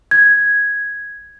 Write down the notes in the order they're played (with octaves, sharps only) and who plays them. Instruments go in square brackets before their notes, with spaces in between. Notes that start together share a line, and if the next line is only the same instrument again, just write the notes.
[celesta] G#6